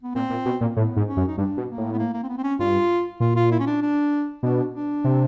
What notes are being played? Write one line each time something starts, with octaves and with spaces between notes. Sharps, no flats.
B3
A#2 C4
A#2
B2
A#2
A2 B3
G#2
C#4
F#2
D#4
G2 D4
B2
A#3
A2
B3
A#3
A#3
C4
B3
C4
C#4
G2 F4
A#2 F4
F4
E4
C#4
D4
D4
B2 D4
D4
C3